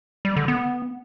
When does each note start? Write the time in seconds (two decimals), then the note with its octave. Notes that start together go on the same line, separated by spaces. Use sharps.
0.25 G3
0.36 D3
0.48 B3